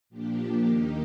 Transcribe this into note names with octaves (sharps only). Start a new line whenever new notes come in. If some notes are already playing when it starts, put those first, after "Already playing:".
A#2 F3 A#3 D4 G4
D#2 D#3 A#3 D#4